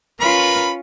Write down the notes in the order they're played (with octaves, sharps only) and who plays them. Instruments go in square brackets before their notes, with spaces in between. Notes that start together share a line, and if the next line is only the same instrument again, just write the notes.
[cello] C#4 F4 [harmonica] A#4 B4 B5